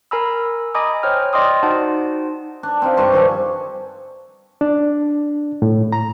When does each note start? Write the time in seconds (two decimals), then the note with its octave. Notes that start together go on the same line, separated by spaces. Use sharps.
0.11 A#4 G#5 A#5 B5 E6
0.74 D#5 G#5 A#5 B5 D6 D#6
1.03 C5 C#5 G5 F6
1.33 D5 D#5 G5 C6 D6 D#6
1.63 D#4 F#4 C5 F#5 A5
2.63 D4
2.82 C4 D#4 F5
2.97 G2 D4 C5 C#6
3.12 D#3 F3 A4 G#5
4.61 D4
5.62 A2
5.92 A#5